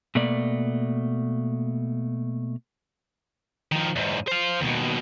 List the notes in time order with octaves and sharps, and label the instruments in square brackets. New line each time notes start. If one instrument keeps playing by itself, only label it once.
[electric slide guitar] B2 A3 A#3 D5
[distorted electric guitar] D#3 F3
E2 G#2
C5 F5
D#2 B2